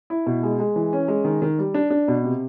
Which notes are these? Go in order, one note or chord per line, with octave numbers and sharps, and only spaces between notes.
E4
B2
G#3
G#3
E3
C#4
G#3
D#3
D#3
G3
D4
D4
B2
C3